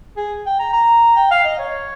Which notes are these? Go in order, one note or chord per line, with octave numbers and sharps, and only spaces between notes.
G#4
G5
A#5
A#5
G5
F5
D#5
C#5